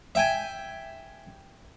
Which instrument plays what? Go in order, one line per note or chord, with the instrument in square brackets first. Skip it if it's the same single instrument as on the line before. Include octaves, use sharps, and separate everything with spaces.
[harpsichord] E5 G5 G#5